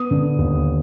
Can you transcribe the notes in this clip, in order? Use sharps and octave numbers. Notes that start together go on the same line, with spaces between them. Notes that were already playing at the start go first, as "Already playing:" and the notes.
Already playing: B3 D#6
D3
D#2